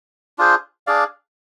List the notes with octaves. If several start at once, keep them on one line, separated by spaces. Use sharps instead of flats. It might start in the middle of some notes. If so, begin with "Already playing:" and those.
D4 F4 G#4 C5
D4 G#4 D5 F5